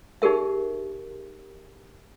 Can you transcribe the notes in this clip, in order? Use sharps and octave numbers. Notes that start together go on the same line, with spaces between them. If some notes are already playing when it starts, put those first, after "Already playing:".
D#4 G4 G#4 A#4 E5